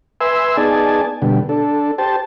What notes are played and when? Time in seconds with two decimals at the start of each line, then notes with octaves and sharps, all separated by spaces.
0.21 B4 E5 G#5 C6 E6
0.57 B3 D#4 G#4 D5 G#5 A5
1.22 B2 D3 G3
1.49 D4 A4
1.98 G4 C5 A5